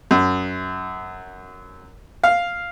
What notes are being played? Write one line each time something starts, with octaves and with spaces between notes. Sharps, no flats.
F#2
F5